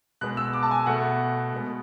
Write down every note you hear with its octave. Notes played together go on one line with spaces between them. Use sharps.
B2 G#3 B3 F#6
E6
D6
A5
G#5
B2 A3 F#5
B2 G#3 B3